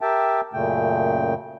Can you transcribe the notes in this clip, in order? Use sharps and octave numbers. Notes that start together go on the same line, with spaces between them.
G4 A#4 E5 G5 A5
F#2 A#2 C#3 A3 G5